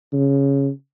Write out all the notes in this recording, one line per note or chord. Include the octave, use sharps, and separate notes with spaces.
C#3